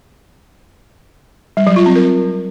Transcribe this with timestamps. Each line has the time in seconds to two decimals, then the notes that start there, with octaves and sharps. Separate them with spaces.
1.57 G3
1.67 F#3
1.76 F4
1.86 C4
1.96 A#4